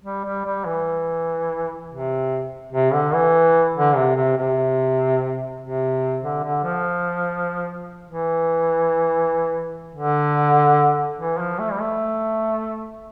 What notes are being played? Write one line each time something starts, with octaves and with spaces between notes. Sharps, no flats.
G3
G3
G3
E3
C3
C3
D3
E3
D3
C3
C3
C3
C3
D3
D3
F3
E3
D3
E3
F3
A3
G3
A3